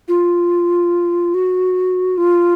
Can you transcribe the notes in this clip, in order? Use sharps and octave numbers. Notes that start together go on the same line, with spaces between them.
F4
F#4
F4